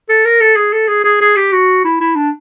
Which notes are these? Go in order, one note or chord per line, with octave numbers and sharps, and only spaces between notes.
A4
A#4
A4
G#4
A4
G#4
G#4
G#4
G4
F#4
E4
E4
D4